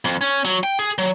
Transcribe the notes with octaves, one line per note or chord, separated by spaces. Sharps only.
F2
C#4
F#3
G5
G#4
F#3